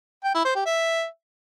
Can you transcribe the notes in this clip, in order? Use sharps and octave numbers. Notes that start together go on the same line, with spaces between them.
G5
E4
C5
G4
E5